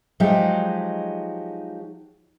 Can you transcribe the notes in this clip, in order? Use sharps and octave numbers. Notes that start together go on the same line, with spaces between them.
F3 F#3 G#3 D#4 G4